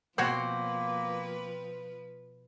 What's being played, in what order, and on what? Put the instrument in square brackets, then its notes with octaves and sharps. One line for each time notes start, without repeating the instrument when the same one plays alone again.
[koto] B2 F#4 C#5 [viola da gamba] F3 B4 [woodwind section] A#3 [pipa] C4